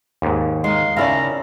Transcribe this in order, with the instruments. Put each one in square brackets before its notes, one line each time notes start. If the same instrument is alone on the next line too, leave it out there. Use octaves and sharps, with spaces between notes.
[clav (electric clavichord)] D#2 G#2
[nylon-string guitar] G#3 [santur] D#4 F5 [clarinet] C6
[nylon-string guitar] D#2 C#3 D5 [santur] C#4 E4 A5 [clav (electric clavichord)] F5 [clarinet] A#5